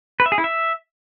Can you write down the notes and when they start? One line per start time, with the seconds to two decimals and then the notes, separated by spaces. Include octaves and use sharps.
0.20 B4
0.26 E5
0.32 G#4
0.38 E4
0.44 E5